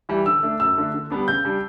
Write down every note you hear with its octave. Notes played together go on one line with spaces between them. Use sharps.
E3 G3
D3 E6
A3 D4
F#2 E6
D3 A3 D4
D3
G3 B3 D4
C#3 G6
G3 D4